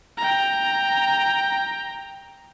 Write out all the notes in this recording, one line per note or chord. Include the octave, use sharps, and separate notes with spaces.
G5 A#5